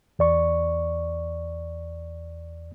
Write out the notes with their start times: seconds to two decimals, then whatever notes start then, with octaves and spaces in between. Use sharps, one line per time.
0.19 E2 D5 C#6